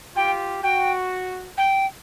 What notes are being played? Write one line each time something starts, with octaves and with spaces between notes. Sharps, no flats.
F4 G4 G5
F#4 G5
G5